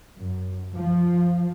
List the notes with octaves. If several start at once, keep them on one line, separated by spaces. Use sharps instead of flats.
F#2
F3